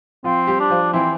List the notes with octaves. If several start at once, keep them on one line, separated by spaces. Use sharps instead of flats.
F3 C4 F4
G3 G4
D4
F3 F4
E3 C4 E4